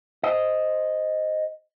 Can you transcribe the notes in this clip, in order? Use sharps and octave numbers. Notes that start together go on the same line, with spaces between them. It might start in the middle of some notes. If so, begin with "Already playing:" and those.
C5 D#5